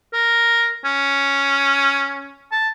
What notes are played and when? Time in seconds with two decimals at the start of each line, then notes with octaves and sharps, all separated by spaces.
0.13 A#4
0.85 C#4
2.52 A5